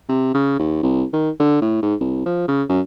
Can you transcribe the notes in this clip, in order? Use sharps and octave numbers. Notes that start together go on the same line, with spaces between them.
C3
C#3
D#2
C2
D#3
D3
A2
G#2
C2
F3
C#3
F#2